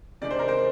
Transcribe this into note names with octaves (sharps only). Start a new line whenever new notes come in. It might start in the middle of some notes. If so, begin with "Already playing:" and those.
C3 D#3 G#3 D4 D5
C5
A#4
C5